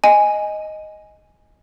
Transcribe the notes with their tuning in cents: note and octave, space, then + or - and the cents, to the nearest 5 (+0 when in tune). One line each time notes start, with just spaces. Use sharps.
D#5 +0 G#5 +0